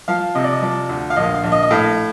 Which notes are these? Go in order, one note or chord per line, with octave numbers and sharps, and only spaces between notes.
F3 F5
C3 D#5
D5
D#5
F3 D5
D2
F5
A#1 D#5
F5
A#1
D#5
D#5
A2 F5